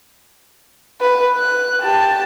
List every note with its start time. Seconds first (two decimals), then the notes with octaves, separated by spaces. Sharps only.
1.01 B4
1.37 F#6
1.82 G4 A5